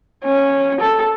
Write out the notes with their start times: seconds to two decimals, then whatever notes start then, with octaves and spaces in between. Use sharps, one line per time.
0.25 C#4
0.81 A4